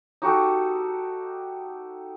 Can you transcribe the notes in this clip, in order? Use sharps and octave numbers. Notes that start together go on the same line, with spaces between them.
D#4 F#4 G4 A4